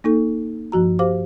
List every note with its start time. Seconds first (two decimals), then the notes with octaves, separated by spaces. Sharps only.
0.04 A#3 D#4 A4
0.72 G2 F3 F#4 A#5
0.99 G4 C5 F5 D6